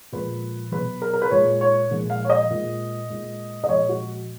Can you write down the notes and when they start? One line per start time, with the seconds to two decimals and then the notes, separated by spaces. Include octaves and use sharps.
0.12 A#2 F3 G#3 B4
0.72 B2 F#3 B4
1.02 A#4
1.13 A#4
1.22 B4
1.31 A#2 G#3 C#5
1.61 C#5
1.91 A#2 F3 G#3
2.10 F5
2.25 C#5
2.30 D#5
2.50 A#2 G#3
3.10 A#2 G#3
3.64 D#5
3.68 A#2 F3 G#3 C#5
3.89 F#4